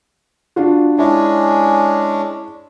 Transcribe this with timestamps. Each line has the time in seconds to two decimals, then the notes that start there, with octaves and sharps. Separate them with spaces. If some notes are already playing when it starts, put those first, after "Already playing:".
0.56 D4 F4 F#4
0.98 G#3 C#4 D4 E4